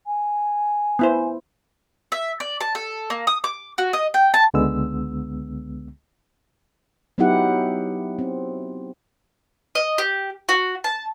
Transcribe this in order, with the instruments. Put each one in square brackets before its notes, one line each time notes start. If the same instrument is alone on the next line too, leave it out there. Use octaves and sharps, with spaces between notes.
[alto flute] G#5
[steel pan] B3 E4 C5
[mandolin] E5
D5
A5
A4
A#3
D#6
D6
F#4
D#5
G5
A5
[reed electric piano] C#2 D3 G#3 B3 E6
[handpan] F#3 B3 D#4 E4 G4 F#5
C4
[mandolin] D#5
G4
F#4
A5